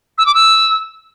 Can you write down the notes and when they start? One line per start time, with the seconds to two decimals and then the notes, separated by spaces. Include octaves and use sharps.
0.18 E6
0.26 D6
0.34 E6